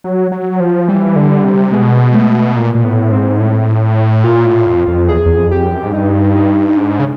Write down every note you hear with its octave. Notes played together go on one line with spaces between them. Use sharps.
F#3
F#3
F3
E3 G3
D3
C3
B2 G#3
A3
A#2 A#3
A#2
A2 B3
G#2 C4
A2
A#2 F4
A2
F2
F2
E2 G#4
E2
F2
G4
F#2
G#2
G2 D#4
D#4
D#4
G#2 D4
C#3